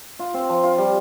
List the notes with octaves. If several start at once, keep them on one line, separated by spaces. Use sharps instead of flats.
F4
C4
F3
F4
G3